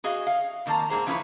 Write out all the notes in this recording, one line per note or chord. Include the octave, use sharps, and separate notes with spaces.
F#4 G#4 D#5 F5
F5
F2 D#3 A#3 F#4 A5 A#5
G#2 A#3 G#4 C5 A#5
F3 C#4 E4 A#4 B4 C#5